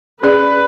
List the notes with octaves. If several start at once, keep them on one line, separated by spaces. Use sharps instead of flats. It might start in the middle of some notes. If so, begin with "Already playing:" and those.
C#4 G#4 B4 D5